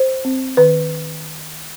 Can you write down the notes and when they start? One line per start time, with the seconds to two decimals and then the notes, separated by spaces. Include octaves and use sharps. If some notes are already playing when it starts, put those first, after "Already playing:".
Already playing: C5
0.25 C4
0.57 D#3 B4